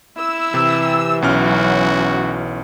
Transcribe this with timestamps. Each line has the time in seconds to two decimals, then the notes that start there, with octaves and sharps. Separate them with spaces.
0.17 E4 E6
0.54 C3 E3 G4
1.22 B1 F#3 C#4 F#4 F6